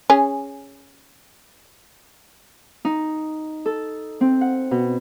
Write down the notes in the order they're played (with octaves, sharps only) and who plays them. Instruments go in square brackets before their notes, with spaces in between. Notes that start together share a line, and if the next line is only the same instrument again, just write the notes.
[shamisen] C#4 G#4
[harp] D#4
A4
C4
F#5
B2